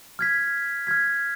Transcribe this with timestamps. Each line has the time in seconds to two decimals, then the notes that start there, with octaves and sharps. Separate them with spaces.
0.19 F6 G#6 B6
0.87 F6 G#6 B6